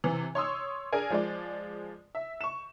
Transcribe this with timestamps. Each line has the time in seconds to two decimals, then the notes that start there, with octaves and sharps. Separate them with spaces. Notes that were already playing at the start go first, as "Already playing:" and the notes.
0.04 C3 E3
0.35 C#5 C6 D#6 E6
0.92 D4 G#4 A#4 G#5
1.10 F3 G#3 D5
2.15 E5
2.41 C#6 E7